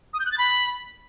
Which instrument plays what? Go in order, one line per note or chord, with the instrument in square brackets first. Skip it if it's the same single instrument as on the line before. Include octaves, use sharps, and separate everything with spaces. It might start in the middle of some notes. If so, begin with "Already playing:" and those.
[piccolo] D#6
G6
F#6
A6
B5